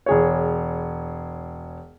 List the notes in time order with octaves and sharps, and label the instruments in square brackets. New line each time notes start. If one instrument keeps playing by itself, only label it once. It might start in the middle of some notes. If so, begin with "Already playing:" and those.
[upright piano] E1 G#4 C#5